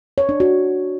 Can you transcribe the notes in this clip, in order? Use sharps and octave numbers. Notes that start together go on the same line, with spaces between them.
C#5
D4
F#4